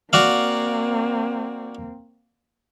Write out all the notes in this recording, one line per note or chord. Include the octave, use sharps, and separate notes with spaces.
A#3 C4 F#4 D5 F5